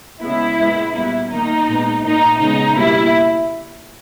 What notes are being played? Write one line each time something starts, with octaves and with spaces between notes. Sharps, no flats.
C#3 G#3 B3 E4
A#2 G#3 B3
A#2 G3 B3 E4
D#3 A#3 D#4
A#2 G#3 B3
A#2 A#3 D#4
C#3 G#3 B3 D#4
B2 G3 A#3 E4